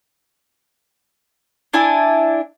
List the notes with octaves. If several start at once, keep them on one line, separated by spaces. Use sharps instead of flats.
D4 E4 G#5